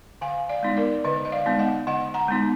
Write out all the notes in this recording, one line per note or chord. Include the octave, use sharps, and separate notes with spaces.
D3 F5 G#5
D5 F5
G#3 B3 D#4
A#4 D5
D3 B4 D#5
D#5
D5 F5
G#3 B3 D#4
D#5 F#5
D3 D#5 F#5
F#5 A#5
G#3 B3 D#4